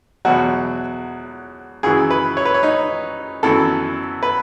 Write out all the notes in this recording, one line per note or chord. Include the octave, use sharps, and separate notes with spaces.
E2 B2 F#3 F#4
F#2 C#3 E3 G#4
B4
C#5
B4
C#5
D#4
F#2 E3 B3 A4
B4